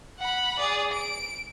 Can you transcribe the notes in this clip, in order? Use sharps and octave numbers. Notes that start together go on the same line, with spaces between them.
F#5 B5
G#4 D5
D7